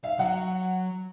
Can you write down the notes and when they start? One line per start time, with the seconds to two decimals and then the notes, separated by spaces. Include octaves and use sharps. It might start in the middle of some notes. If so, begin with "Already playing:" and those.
0.04 E5 F5
0.19 F#3 F#5